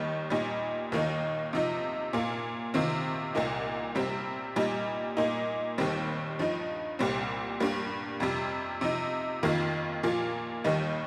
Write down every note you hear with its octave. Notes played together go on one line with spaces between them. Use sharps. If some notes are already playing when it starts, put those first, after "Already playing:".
Already playing: D#2 D#3 G3 D#4
A#2 G3 D#4
D#2 D#3 A#3 D#4
C3 F3 D#4
A#2 A#3 F4
C3 D#3 C4 F4
C2 A#2 A#3 D#4
C3 G3 C4
A#2 G3 D#4
A#2 A#3 D#4
D#2 D#3 G3 C4
G2 F3 D#4
C2 A#2 G3 C4
G2 G3 A#3
F2 C3 G3
C3 F3 D#4
F2 D#3 A#3 F4
A#2 F3 A#3 F4
D#2 D#3 G3 D#4